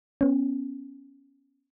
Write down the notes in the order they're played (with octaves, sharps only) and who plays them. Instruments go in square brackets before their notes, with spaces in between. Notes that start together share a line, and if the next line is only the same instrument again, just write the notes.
[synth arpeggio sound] B3 C#4